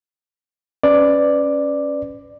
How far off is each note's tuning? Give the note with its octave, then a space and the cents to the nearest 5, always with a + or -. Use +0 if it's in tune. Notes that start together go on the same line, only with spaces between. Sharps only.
C#4 +0 B4 +20 D5 +5